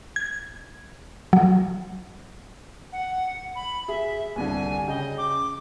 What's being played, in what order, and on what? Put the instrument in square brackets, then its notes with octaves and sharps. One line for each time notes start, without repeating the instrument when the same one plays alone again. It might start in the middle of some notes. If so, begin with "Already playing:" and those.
[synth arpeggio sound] G#6
F#3
[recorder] F#5
B5
[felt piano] G#4 [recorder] E5
[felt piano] C2 G2 D3 [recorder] G#5
[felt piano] C#3 G5 [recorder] D#5
[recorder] D6